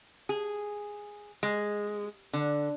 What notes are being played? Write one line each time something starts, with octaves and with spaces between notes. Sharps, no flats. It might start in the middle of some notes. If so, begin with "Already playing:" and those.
G#4
G#3
D3